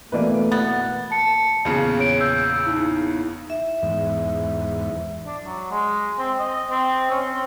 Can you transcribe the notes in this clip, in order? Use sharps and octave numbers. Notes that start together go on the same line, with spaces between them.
B2 E3 A3 A#3 B4 D5
B3 A6
A5 C#7
E2 A#2 C#3
C#5 D7
E6 G6
D#4 E4
E5
E2 G#2
D4
F#3
G#3
C4
D#5
C4
C#4
C4